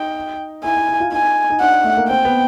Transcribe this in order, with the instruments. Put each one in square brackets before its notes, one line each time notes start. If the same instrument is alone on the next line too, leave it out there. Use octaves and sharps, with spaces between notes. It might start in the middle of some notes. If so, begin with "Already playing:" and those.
Already playing: [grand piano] D#4 [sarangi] G5
[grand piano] E4 [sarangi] G#5
[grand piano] E4
E4
F4
[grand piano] D#4 [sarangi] G#5
[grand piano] D#4
[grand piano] D4 [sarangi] F#5
[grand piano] A3
A#3
[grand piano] C4 [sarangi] G5
[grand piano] B3